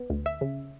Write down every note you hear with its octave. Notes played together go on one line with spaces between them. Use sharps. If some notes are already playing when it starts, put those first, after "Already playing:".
Already playing: B3
D2
E5
C#3